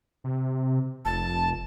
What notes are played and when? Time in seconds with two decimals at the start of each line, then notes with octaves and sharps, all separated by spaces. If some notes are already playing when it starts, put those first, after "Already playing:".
0.24 C3
1.05 F1 A5